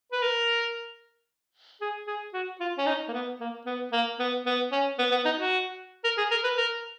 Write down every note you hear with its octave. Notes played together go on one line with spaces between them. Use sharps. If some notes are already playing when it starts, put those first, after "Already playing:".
B4
A#4
G#4
G#4
F#4
F4
C#4
D#4
A#3
B3
A#3
B3
A#3
B3
B3
C#4
B3
B3
D#4
F#4
A#4
G#4
A#4
B4
A#4